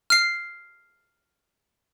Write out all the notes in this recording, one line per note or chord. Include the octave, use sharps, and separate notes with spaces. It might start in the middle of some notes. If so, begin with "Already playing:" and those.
F6 C7